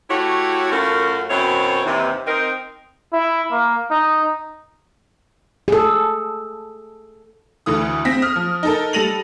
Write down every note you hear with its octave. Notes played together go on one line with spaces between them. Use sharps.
A3 E4 F#4 G4 C#5
F#2 A3 C#4 F4 F#4 A#4
F#2 B2 E3 C4 C#5
D#2 C3 E3
C4 D#4 A#4
E4
A#3
D#4
G#4 A4
D2 D3 E3 D#6
C4 A#6 B6
D#6 F6
F3
D#4 A4 A#4
G3 A4 A#6 D#7 F7 F#7